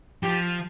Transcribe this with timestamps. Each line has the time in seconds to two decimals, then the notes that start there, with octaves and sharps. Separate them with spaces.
0.23 F3 G4